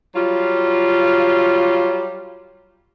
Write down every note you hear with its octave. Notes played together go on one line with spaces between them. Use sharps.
F#3 G3 F4